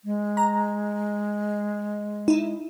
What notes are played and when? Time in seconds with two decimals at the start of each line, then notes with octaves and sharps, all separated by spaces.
0.05 G#3
0.37 A#5
2.28 D#4 E4